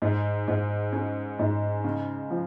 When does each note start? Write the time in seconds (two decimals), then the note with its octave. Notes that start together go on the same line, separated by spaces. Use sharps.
0.02 G#2
0.48 G#2
0.92 C#4
1.39 G#2
1.84 C#3
2.30 F3